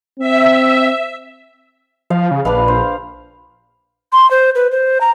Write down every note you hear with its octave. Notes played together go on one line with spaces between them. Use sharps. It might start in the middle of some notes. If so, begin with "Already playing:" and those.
C4 E5
F3 F5
C#3
A#1 D4 B4 F5
C5
C6
C5
B4
C5
A#5